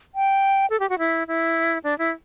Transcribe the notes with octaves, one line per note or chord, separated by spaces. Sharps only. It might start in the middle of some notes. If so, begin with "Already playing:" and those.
G5
A4
G4
F#4
E4
E4
D4
E4